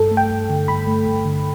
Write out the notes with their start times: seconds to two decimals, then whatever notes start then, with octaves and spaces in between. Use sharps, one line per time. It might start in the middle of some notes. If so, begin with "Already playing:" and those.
Already playing: G2 A4
0.11 A3
0.17 G5
0.30 G2
0.50 D3
0.68 G2 B5
0.87 A3
1.07 G2
1.25 D3